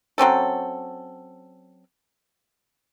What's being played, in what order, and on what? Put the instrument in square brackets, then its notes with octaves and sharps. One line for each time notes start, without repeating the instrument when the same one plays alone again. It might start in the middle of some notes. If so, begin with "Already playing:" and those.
[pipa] F#3 C4 C#4 A4